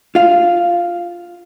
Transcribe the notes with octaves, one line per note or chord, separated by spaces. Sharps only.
F4 F5